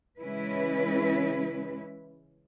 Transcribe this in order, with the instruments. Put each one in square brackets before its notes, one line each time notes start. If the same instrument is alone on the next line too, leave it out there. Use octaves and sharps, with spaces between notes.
[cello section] C#3 E3 G#3 C#4 E4 B4